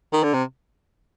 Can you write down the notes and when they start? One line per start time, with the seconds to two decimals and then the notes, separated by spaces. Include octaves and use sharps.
0.13 D#3
0.23 D3
0.34 C3